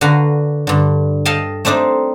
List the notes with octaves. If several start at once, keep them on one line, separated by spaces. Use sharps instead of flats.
D3 F#4 B4 F5 A#5
G2 D3
A4 D#5 F5 G5 A5
A3 C4 D4 D#4 C5